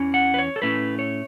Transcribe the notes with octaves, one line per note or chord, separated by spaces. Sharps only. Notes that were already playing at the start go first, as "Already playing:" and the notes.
Already playing: E2 E3 C#4
F#5
B4
C#5
A4
A2 A3 C#4 E4 B4
C#5